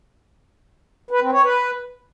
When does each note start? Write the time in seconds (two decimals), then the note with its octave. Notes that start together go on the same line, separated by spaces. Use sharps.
1.11 B4
1.22 C4
1.32 C#5
1.43 B4